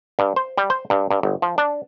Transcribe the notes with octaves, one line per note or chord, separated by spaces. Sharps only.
G2
C5
G3
C5
G2
G2
G1
F3
D4